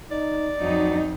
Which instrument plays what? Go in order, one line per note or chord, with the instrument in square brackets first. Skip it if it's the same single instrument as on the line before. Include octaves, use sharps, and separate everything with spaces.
[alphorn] D#4 [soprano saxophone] D5
[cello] F2 [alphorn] F#3 [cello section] D#4